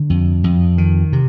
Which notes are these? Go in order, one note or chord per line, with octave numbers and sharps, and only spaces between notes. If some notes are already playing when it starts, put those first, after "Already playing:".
Already playing: D3
F2
F2
D#3
C3